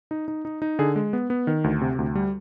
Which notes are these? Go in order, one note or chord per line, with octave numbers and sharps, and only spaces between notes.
D#4
D#4
D#4
D#4
D3 G#4
G#3
B3
B3
D#3
D2
C3
D2
G3